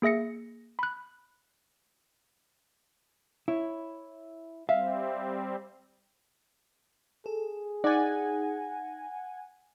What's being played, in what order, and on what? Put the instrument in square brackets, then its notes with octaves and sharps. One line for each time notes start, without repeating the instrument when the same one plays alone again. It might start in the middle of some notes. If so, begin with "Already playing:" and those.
[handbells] A#3 G#4 E5 A#6 C#7
B5 F#6
[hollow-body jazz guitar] E4 [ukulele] C#5
[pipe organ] G3 C4 [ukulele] E5 [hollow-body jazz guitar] F5
[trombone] G#4 [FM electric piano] A4
[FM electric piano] D#4 [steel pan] D5 [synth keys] F#5 G#5